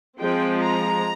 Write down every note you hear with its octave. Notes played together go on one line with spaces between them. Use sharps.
F3 G#3 C4 G5
A#5